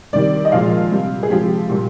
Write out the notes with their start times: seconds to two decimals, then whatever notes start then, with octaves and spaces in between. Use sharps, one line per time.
0.13 C3 D#3 G3 D5
0.45 D#5
0.52 A#2 F3 G#3 F5
0.91 C3 G3
1.23 G#4
1.30 C3 F3 G#3 G4
1.69 A#2 G3